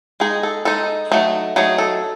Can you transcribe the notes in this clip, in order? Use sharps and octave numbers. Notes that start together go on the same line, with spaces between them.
G#3 D#4 G#4
A4
G#3 D#4 A4
F#3 A3 D#4
F#3 A3 D#4 G#4
A4